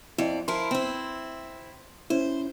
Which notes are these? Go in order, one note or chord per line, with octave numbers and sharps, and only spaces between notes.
F2 E4 D5
F3 E4 A#4 C6
C4 E4
C#4 E4 C5